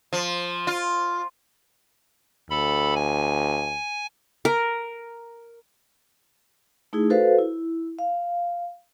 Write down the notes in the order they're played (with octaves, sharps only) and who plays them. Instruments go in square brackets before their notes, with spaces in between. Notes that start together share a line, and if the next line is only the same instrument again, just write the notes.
[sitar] F3
F4
[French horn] D2 [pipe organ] A4 B5
[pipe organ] G#5
[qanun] A#4
[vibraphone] A3 D#4 E4 G#4
F#4 A4 B4 C5 F5
E4
F5